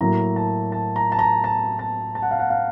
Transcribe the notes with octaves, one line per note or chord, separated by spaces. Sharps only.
A2 F#3 A#3 A#5
A5
A5
A#5
A5
A#5
A5
A5
A5
F#5
F5
F#5
F5